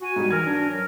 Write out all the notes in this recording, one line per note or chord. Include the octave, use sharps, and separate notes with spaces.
F#4 G#5
G#2 G3
E3 A#4 F6 G#6
D4
F#3